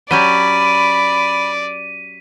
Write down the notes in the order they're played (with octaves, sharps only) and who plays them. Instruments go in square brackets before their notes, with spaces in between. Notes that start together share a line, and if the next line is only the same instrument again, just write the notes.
[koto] F#3 C#4 G4 [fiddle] D5 [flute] B5 [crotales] B6 D#7